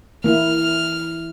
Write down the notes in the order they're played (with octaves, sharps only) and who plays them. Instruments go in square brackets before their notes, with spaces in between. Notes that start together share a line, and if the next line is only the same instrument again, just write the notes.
[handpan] E3 E4 [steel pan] A#3 [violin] F6